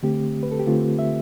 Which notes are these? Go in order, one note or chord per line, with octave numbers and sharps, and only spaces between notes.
D3 A3 C4 G4
B4
A4
G4
D3 A3 C4 F4
E5